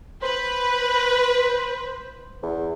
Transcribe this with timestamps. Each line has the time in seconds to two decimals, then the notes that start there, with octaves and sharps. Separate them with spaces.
0.23 B4 C5
2.43 E2